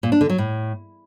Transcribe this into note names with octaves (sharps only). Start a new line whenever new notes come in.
A#2
D4
D3
F#3
A2